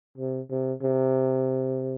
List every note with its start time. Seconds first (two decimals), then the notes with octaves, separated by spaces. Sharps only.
0.18 C3
0.50 C3
0.82 C3